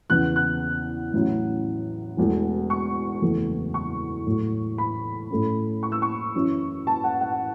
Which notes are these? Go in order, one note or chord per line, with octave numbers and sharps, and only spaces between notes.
E2 C#3 E3 B3 F#6
F#6
A1 A2 F#3 C#4 E4
E1 E2 B2 A3
C#6
F#1 E2 E3 A3
C#6
A2 F#3 A3
B5
A2 A3 C#4
C#6
E6
C#6
F#2 E3 C#4 E4
A5
F#5
F#5